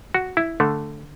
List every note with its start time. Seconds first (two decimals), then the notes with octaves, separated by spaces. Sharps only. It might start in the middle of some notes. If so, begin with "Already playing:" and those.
0.14 F#4
0.37 E4
0.60 D3 A3